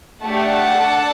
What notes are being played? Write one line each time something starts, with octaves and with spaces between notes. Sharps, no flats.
A3 D4 G4 F#5 A5
D4 A4